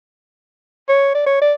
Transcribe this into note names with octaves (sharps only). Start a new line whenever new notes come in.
C#5
D5
C#5
D5